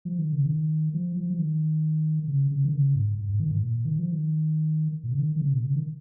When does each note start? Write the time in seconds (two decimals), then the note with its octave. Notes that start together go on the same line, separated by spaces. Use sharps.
0.05 F3
0.19 D#3
0.33 C#3
0.46 D#3
0.94 F3
1.16 F3
1.30 F3
1.39 D#3
2.28 C#3
2.51 C#3
2.64 D#3
2.73 C#3
2.95 G#2
3.18 G#2
3.29 G#2
3.40 D#3
3.51 G#2
3.63 A#2
3.85 D#3
3.99 F3
4.12 D#3
5.04 A#2
5.11 C#3
5.19 D#3
5.36 D#3
5.41 C#3
5.53 A#2
5.64 C#3
5.75 D#3